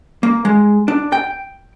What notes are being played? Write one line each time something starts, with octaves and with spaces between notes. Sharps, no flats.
A#3
G#3
D4
G5